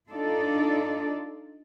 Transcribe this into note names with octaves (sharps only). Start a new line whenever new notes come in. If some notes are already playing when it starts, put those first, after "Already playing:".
D4 D#4 F4 A4 D5